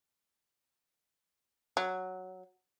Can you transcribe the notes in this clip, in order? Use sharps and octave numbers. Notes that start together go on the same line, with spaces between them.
F#3